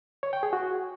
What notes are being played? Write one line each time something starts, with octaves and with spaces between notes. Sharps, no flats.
C#5
G5
G#4
F#4